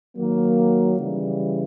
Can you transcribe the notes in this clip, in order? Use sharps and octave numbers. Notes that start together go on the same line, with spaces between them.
D#3 F#3 A#3
C#3 E3 G3